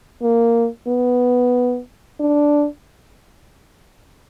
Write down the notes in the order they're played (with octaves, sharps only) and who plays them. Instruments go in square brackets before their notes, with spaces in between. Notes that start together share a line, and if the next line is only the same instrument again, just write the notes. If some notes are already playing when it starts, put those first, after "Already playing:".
[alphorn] A#3
B3
D4